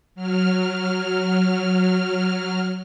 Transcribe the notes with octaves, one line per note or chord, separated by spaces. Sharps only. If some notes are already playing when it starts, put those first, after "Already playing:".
F#3 F6